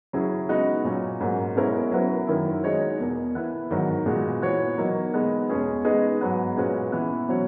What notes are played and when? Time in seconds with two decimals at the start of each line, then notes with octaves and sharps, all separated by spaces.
0.13 C#3 F#3 C#4 E4 G#4
0.49 G#3 B3 D#4 F#4
0.84 A#2 F#3 C#4
1.20 G#2 F#3 A#3
1.56 B2 G#3 C#4 E4 A#4
1.92 F#3 B3 E4 A#4
2.27 F#2 D#3 F#3 A#3 E4
2.63 G#3 D#4 F#4 C#5
3.00 E2 B2 A#3
3.35 E3 B3 E4 B4
3.71 G#2 D#3 F#3
4.06 A#2 G#3 B3 F#4
4.42 E3 B3 F#4 C#5
4.78 B2 F#3 A#3 D#4
5.14 B2 G#3 B3 D#4
5.49 E2 B2 G#3 C#4 G#4
5.85 G#3 B3 D#4 G#4 B4
6.21 G#2 F#3 B3
6.56 A#2 G#3 C#4 F#4 B4
6.92 E3 B3 E4
7.28 B2 F#3 C#4 F#4 C#5